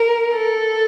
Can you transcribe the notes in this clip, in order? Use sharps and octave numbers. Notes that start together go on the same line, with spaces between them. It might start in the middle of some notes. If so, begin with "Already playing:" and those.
Already playing: A#4
A4